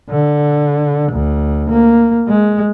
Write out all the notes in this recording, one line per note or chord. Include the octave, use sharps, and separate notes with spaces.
D3
D2
A#3
G#3